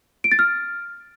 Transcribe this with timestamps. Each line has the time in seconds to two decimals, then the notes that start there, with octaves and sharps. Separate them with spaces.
0.24 D7
0.32 A6
0.39 F6